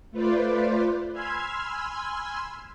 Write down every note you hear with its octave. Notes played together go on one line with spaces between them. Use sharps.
A3 F4 B4 C5 D5
G#5 B5 C6 E6 F6 G#6